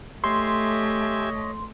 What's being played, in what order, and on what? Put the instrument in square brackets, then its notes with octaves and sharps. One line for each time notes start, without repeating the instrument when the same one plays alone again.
[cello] A3 [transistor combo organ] G4 E5 G#5 [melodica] C#5 D#5 [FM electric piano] C6